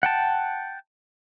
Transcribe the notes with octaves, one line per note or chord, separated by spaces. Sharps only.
F#5 G5 A5